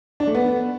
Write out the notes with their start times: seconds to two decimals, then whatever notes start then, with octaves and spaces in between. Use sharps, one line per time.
0.20 D4
0.27 A3
0.35 B3